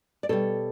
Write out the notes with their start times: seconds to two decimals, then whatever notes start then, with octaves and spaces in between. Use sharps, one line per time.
0.23 D5
0.29 B2 G3 A4 C#5